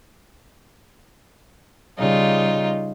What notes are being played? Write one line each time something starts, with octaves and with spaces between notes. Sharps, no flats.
C#3 G3 D#4 F4